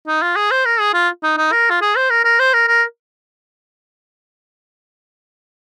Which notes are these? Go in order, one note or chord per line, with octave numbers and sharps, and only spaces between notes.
D#4
F4
G#4
C5
A#4
G#4
F4
D#4
D#4
A#4
F4
G#4
C5
A#4
A#4
C5
A#4
A#4